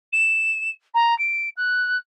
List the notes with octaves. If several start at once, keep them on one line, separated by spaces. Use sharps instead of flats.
E7
A#5
D7
F#6